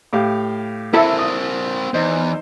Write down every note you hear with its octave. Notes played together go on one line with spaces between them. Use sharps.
A2 G4 F5
C4 E4 A4 A#4 E5
D#6
E2 D#4 C5